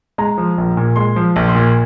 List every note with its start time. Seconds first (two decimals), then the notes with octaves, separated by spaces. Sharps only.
0.18 G#3 A#5
0.38 F3
0.58 A#1
0.77 A#2
0.96 G#3 C6
1.16 F3
1.36 A#1
1.48 C6
1.55 A#2